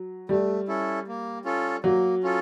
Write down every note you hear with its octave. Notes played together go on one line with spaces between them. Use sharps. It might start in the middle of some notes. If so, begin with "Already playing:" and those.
Already playing: F#3
G3 A3
C#4 E4 A4
A#3
C#4 F4 A4
F#3 A#3
C#4 F4 A4